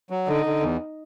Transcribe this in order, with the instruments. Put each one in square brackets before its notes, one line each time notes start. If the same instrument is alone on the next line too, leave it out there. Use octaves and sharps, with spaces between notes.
[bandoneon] F#3
[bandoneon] D3 [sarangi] D#4
[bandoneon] D3
E2